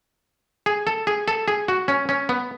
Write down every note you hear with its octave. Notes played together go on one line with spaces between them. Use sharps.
G#4
A4
G#4
A4
G#4
F#4
C#4
C#4
B3